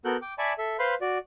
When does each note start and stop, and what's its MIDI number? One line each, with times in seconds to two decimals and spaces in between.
0.05 0.17 59
0.05 0.17 66
0.05 0.17 69
0.05 0.17 70
0.05 0.17 90
0.05 0.17 91
0.22 0.34 79
0.22 0.34 86
0.38 0.53 74
0.38 0.53 76
0.38 0.53 80
0.38 0.53 81
0.38 0.53 83
0.38 0.53 85
0.58 0.77 69
0.58 0.77 76
0.79 0.95 71
0.79 0.95 72
0.79 0.95 77
0.79 0.95 83
0.79 0.95 84
1.01 1.18 66
1.01 1.18 74